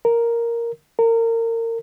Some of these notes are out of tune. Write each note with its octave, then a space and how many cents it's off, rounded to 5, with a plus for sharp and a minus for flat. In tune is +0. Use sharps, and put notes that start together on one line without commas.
A#4 +0
A#4 -30